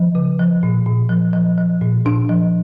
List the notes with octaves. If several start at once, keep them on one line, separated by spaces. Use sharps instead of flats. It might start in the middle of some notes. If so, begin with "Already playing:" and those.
Already playing: F3
C#3
F3
A#2
A#2
F3
F3
F3
A#2
A#2 D4
F3